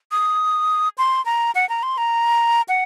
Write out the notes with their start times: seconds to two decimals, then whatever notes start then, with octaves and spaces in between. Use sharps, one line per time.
0.11 D#6
0.98 C6
1.26 A#5
1.55 F#5
1.69 A#5
1.83 C6
1.98 A#5
2.68 F#5